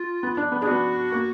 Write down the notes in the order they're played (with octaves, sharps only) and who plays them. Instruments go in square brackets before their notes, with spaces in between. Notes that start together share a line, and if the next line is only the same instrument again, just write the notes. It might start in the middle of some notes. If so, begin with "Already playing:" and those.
Already playing: [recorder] F4
[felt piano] B3
D4
B3
[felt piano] D4 [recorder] G#4
[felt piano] B3 [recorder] F#4
[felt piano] A#3